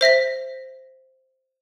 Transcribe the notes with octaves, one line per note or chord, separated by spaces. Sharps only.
C5 E5 A#6 B6